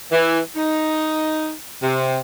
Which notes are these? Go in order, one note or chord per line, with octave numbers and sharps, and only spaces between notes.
E3
D#4
C3